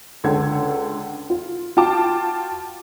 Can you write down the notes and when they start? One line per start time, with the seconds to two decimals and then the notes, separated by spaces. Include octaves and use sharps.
0.24 C#2 D3 A4 G#6
1.30 F4
1.77 F4 F#4 G5 A5 D6